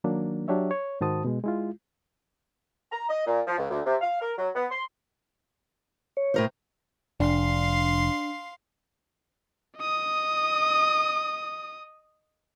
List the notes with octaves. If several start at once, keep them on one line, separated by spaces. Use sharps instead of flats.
D#3 F#3 A#3 D4
F#3 D4 G4 C#5 E5
C#5
G#2 D#3 F#4 C5 A5 D#6
B2 G#3
G#3 E4 F4
A#5
D#5
A#2
F3
C#2
D2
C3
F5
A#4
F#3
B3
C6
C#5
A2 A#4 C5
F1 D4 F5 C6
D#5 D#6